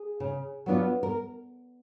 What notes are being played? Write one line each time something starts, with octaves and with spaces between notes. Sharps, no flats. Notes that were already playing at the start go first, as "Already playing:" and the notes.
Already playing: G#4
C#3
F#3 B3 D4 F4
A#4